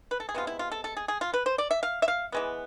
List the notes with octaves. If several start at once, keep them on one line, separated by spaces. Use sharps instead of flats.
B4
A4
G#4
C3 G#3 B3 F4
E4
F4
A4
A4
G#4
G#4
F4
B4
C5
D5
E5
F5
E5
F5
E3 G#3 B3